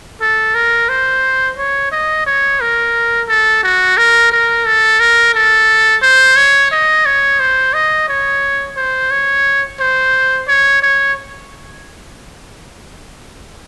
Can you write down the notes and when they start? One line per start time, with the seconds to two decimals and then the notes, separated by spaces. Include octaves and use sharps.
0.21 A4
0.55 A#4
0.89 C5
1.57 C#5
1.92 D#5
2.27 C#5
2.61 A#4
3.28 A4
3.64 F#4
3.97 A#4
4.32 A#4
4.66 A4
5.00 A#4
5.35 A4
6.03 C5
6.37 C#5
6.72 D#5
7.06 C#5
7.40 C5
7.74 D#5
8.09 C#5
8.77 C5
9.11 C#5
9.80 C5
10.48 C#5
10.83 C#5